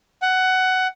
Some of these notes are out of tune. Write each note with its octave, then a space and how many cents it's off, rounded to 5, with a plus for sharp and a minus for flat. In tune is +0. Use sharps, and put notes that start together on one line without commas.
F#5 +15